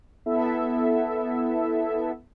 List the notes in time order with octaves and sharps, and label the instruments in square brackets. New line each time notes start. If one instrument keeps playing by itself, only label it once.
[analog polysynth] B3 E4 A4 E5